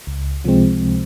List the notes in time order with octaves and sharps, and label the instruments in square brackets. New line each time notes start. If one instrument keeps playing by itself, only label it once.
[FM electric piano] C#2
C3 F3 G#3 C4